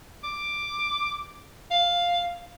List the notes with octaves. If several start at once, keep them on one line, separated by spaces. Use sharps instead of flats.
D6
F5